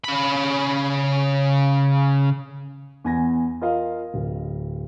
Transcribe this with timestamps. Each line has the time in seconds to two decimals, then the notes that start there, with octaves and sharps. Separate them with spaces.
0.04 C#3 B5
3.04 E2 G#5 A#6
3.61 F4 A#4 D#5 F5
4.14 D1